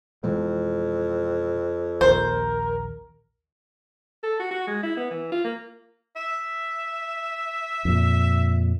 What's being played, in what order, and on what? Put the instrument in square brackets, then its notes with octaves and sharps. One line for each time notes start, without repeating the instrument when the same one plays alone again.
[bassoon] F2 [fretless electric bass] B2 E3 G#3
[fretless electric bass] A#1 D#2 [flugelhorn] A#4 [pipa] C5
[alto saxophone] A4
F#4
F#4
G#3
E4
B3
E3
F4
A#3
[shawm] E5
[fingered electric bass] F2 A#2